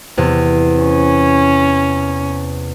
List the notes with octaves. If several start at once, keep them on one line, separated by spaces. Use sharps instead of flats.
E2 C3
C#4